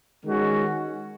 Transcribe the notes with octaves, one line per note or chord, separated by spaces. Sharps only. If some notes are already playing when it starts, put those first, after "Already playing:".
D#3 G#3 C#4 F#4